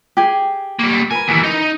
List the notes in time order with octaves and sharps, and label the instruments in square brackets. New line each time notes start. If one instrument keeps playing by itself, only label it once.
[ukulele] G4 G#4
[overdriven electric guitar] G3 A#3
[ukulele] A#4 B4 [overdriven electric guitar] G#5
[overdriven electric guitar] D#2 E3
D#4